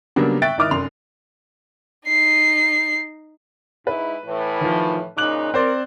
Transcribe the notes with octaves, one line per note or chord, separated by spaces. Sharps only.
C#3 F#3 G3 A#3 B3 D4
E5 G5 C#6 F#6 A6 D7
G#1 D#4 E4 D6 D#6 F6
F1 F#2 C6 F7
D#4 C7
G#2 E4 B4
A2 E3
D#3 F3
A#2 C#3 D#4 D6 F#6 F#7
C4 A#4 C5 D5